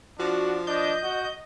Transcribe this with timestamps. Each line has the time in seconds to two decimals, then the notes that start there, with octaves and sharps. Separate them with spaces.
0.19 F3 D4 F#4
0.67 D4 D#5 G6
1.03 F#4